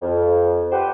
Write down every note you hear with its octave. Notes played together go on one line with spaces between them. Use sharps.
F2
G4 A4 B4 C5 F#5 G5